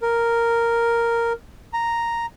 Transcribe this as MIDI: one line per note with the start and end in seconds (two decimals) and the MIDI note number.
0.02 1.33 70
1.73 2.26 82